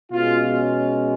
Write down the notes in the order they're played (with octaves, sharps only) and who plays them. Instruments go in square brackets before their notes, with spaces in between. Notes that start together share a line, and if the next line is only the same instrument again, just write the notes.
[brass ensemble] B2 G#3 C#4 F4